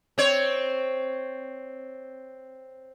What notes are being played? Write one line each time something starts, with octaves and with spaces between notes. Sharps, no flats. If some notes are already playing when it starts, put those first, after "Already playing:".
C4 C#5